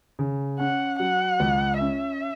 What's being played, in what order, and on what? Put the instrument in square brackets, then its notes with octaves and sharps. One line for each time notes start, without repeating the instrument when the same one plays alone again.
[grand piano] C#3
[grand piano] C#4 [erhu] F#5
[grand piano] F#3 [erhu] F#5
[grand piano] C#2
[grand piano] C#4 [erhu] E5